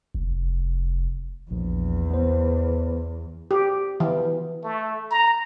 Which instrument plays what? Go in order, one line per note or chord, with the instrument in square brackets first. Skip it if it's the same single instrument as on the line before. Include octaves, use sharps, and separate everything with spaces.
[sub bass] F1
[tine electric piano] A#1 [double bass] E2
[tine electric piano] B3 C5
[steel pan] G4
E3
[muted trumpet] A3
A#5